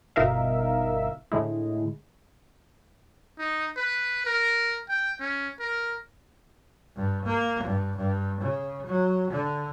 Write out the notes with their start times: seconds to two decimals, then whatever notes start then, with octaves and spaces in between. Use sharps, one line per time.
0.16 G1 B2 D#4 A#4 E5 F5
1.32 A2 D3 G#3 E4
3.38 D#4
3.76 B4
4.26 A#4
4.89 G5
5.20 C#4
5.60 A#4
6.96 G2
7.25 A#3
7.64 G2
7.97 G2
8.41 C#3
8.86 F#3
9.31 D3